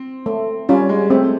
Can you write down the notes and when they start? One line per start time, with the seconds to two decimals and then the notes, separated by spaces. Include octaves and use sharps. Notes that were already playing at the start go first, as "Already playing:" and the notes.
Already playing: C4
0.26 A3
0.69 G3 C#4 F4
0.89 G#3
1.10 A3 C4